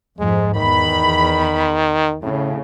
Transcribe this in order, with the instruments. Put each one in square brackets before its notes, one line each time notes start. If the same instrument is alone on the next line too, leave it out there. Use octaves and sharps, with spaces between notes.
[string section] F2 G#2 [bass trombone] G#3
[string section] E2 B5 [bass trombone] D#3
[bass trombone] A2 [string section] C#3